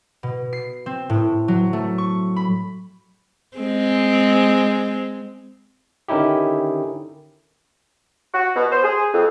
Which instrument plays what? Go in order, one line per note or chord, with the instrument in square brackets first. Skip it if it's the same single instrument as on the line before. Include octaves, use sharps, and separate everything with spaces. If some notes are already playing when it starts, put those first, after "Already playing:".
[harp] B2
C7
C4
A2
F#3
A3
C#6
B5
[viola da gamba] G#3 C4
[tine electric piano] D3 D#3 C#4 D#4 E4 G4
[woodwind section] F#4
B2
C5
G#4
F2